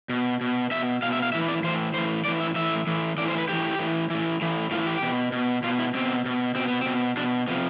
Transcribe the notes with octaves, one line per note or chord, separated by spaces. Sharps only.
B2
B2
B2 E5
B2 F5
E5
F5
A2 E3 E5
D5
A2 E3 C5
A2 E3 C5
A2 E3 D5
E5
A2 E3 E5
A2 E3
A2 E3 D5
C5
B4
A2 E3 G4
A2 E3
A2 E3
A2 E3
A2 E3 F4
G4
B2
B2
B2 F4
E4
B2 C4
B2
B2 C4
B3
C4
B2
B2 D4
C3 F3 B3